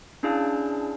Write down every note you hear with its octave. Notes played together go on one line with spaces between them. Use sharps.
C#4 D4 E4 G#4 F5 A5